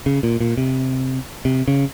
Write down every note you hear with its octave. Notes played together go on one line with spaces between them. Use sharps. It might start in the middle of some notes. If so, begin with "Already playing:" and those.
C#3
A#2
A#2
C3
C3
C#3